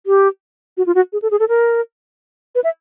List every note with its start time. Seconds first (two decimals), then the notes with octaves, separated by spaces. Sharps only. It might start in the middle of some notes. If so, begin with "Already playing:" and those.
0.07 G4
0.77 F#4
0.86 F4
0.95 F#4
1.13 G#4
1.22 A4
1.31 G#4
1.40 A4
1.49 A#4
2.55 B4
2.64 E5